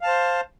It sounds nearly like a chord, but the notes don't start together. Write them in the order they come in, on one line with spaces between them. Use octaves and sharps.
F5 A5 C5